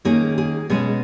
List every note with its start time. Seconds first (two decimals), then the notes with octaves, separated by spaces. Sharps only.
0.05 D#3 A#3 C#4 G#4
0.38 G#4
0.70 B2 G#3 C#4 G#4